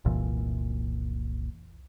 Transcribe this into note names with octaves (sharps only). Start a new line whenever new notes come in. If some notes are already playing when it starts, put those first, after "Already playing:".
F1 C2 A#2 E3